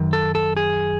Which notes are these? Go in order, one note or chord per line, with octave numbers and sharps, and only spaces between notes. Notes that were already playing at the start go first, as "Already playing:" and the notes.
Already playing: F#2 D#3
A4
A4
G#4